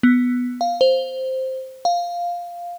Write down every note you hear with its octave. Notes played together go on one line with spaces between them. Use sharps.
B3
F5
C5
F5